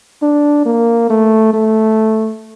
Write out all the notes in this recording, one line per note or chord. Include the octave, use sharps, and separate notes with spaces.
D4
A#3
A3
A3